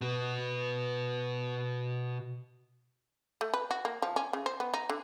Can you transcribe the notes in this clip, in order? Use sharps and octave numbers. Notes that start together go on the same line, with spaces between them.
B2 B3
A3
B4
F#4
A#3
F3
C#4
C#3
C5
B3
D#4
D3